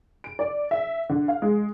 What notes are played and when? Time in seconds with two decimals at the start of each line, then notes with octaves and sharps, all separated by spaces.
0.24 D7
0.39 D5
0.71 E5
1.09 D3
1.28 F5
1.42 G#3